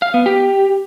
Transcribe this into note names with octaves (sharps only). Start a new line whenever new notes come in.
F5
B3
G4